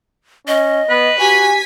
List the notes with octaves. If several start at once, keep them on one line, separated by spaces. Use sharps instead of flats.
C#4 D#5
B3 B4
F#4 G4 G#5 B6